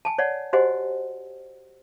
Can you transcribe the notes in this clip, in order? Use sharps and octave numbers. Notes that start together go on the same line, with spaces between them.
G#5 A5
C#5 D5 F#5
F#4 G4 C5 D#5 F#5 G#5